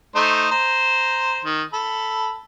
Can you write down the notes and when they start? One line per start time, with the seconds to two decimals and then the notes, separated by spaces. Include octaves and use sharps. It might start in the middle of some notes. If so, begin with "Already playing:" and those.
0.15 A3 D#4 C5
0.51 C5 A#5
1.44 D#3
1.73 A4 B5